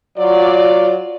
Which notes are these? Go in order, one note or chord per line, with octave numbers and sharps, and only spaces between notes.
F#3 F4 D5